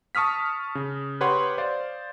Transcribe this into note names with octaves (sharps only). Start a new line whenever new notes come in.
A5 C#6 D#6 F6 B6
C#3
G4 B4 C#5 F#5 C6
C5 D5 F5